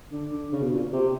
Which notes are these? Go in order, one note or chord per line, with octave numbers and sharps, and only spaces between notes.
D3
D3
C#3
B2
A#2
C3